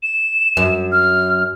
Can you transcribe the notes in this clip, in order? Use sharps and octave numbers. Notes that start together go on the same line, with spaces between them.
E7
F#2
F6